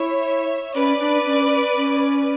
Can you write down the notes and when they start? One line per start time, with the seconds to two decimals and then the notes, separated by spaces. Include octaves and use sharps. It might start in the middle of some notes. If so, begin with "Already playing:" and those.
Already playing: E4 C#5 E5
0.75 C#4 B4 D5
1.00 D4
1.26 C#4
1.77 C#4